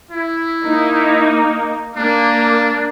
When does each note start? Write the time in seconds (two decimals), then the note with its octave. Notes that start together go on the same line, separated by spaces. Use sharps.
0.11 E4
0.64 A#3 D#4
1.96 A#3 D4